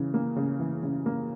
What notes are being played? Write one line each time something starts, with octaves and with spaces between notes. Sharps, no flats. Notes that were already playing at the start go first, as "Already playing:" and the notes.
Already playing: C#3 E3
A#3
C#3
E3
C#3
A#3